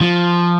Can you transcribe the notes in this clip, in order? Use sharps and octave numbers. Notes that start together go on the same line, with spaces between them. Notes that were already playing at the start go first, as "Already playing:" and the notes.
F3